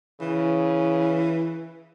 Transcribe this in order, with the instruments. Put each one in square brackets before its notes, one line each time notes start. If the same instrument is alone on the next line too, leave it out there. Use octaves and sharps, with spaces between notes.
[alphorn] C#3 [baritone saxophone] E3